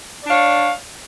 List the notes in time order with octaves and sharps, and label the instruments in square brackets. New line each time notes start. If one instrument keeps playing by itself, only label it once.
[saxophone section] D5
D4
F5
C#5